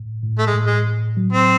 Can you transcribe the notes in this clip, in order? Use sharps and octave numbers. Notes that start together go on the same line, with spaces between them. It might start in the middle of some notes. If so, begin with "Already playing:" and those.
Already playing: A2
A2
A3
G#3
A2
G#3
A2
F#3
C4